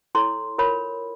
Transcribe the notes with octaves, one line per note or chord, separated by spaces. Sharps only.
E4 A4 C#5 C6
F4 A#4 C#5 B5